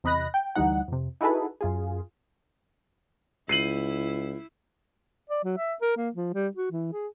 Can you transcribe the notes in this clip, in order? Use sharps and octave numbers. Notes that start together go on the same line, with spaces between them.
E2 C3 D#5 B5 F#6 A#6
G5
D2 E3 G3 D#4 F#5
F2 C3
D#4 E4 F#4 G#4 A4 B4
F#2 F4 G#4
C#2 E4 C7 D#7 F#7
D5
F#3
E5
A#4
A#3
F3
G3
F#4
E3
G#4